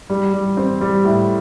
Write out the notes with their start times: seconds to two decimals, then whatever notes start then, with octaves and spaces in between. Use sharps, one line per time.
0.10 G3
0.33 G3
0.57 C4
0.81 G3
1.04 A2